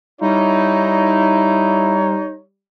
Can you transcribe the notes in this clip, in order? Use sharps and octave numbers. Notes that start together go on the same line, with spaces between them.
G3 D#4 E4 C#5